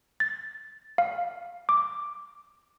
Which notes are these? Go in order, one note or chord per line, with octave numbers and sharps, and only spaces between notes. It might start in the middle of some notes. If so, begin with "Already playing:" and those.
A6
F5
D6